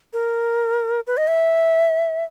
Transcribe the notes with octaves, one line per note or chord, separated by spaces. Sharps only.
A#4
B4
D#5
E5